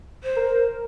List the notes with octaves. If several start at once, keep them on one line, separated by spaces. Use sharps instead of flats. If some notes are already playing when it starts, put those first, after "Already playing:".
C5
A#4